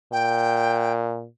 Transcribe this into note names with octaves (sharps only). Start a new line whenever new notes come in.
A#2 G5